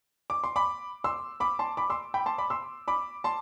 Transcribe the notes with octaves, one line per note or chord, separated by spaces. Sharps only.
D6
C6
B5 D6
C6 E6
B5 D6
A5 C6
B5 D6
C6 E6
G5 B5
A5 C6
B5 D6
C6 E6
B5 D6
A5 C6